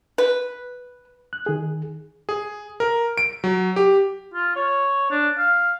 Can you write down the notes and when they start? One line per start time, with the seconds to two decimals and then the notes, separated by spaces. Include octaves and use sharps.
0.18 B4
1.33 F#6
1.46 D#3 G#4
2.29 G#4
2.80 A#4
3.18 D7
3.44 F#3
3.76 G4
4.34 F4
4.56 C#5
5.11 D4
5.38 F5